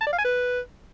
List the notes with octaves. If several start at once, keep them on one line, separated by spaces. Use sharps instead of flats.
A5
D5
F5
G#5
B4